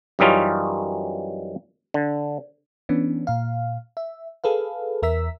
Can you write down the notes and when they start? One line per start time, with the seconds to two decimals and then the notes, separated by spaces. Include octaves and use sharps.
0.19 F#2 E3 G3 C#4 D#4 F4
1.94 D3
2.89 E3 B3 C#4 D4
3.27 A#2 F5
3.97 E5
4.44 G#4 A4 B4 F5
5.02 E2 A#4 E5 E6 B6